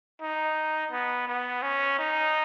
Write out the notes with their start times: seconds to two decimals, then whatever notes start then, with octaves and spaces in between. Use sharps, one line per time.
0.21 D#4
0.92 B3
1.28 B3
1.63 C#4
1.99 D#4